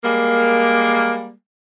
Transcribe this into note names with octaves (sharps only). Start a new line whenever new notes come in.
G3 G#3 A#3